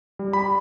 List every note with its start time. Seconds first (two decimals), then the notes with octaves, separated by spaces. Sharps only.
0.19 G3
0.33 B5